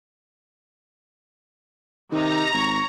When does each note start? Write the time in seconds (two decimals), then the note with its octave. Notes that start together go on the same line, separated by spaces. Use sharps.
2.12 C3 D#3 D#4 A#5
2.53 G#1 C#5 C#6